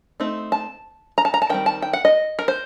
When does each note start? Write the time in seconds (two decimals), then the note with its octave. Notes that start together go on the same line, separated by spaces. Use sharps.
0.20 A3 C4 D#4
0.52 A5
1.18 A#5
1.25 A5
1.34 A#5
1.42 A5
1.50 D#3 G3 C4 G5
1.66 A5
1.82 G5
1.93 F#5
2.05 D#5
2.39 A#4
2.48 C5